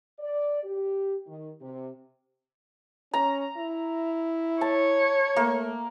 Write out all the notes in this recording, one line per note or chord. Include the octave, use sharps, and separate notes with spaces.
D5
G4
D#3
C3
C#4 A#5
E4
C#5 A5
A3 A#3